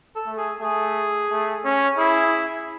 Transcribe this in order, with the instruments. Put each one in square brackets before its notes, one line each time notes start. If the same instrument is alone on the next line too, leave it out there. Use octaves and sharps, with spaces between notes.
[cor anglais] A4
[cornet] A3
[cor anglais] G#4
[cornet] A3 [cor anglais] G#4
[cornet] A3
C#4
[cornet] E4 [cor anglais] G#4